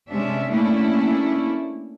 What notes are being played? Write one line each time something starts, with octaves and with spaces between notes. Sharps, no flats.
C3 G#3 C#4 D4 E5
A3 A#3 C#4 D4 E4